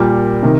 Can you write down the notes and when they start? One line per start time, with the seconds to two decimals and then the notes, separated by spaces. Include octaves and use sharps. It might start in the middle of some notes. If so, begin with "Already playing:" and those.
Already playing: A#2 G3 A#4
0.43 C3 D#3